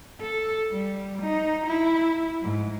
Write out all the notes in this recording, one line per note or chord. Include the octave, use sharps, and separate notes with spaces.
A4
G3
D#4
E4
G#2